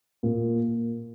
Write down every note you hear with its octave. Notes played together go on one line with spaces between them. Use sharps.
A#2